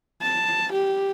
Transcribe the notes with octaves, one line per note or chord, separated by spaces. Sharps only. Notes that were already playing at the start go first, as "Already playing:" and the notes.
A5
G4